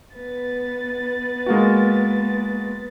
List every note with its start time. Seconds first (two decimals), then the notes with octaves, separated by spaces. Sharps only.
0.15 B3 B4 A6
1.46 G#3 A#3 F#4